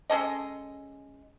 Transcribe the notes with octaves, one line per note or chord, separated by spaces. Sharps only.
G#3 C#4 A4 D#5